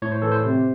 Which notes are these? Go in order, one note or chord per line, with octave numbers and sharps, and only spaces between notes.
A2 C#5
C5
E3 A4
C5
C3